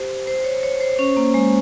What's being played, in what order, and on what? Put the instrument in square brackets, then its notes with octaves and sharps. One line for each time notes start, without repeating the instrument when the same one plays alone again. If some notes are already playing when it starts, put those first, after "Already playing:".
Already playing: [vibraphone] G4 C5
C5
C#5
C#5
C5
C#4
A#3
G#3